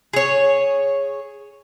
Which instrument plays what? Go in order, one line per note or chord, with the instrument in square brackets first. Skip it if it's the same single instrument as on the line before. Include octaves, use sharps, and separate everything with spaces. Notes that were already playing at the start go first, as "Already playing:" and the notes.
[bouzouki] G#4 C#5